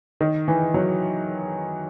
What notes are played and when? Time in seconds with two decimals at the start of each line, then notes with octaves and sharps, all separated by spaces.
0.21 D#3
0.48 E3
0.74 F#3